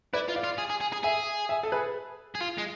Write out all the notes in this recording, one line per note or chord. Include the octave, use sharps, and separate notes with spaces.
E4 B4 D5
F4
D5 F5
F4
G#4
G#4
G#4
G#4
G#4 E5 G#5
E5 G#5
A4
G#4 B4
G#4
F4
G#3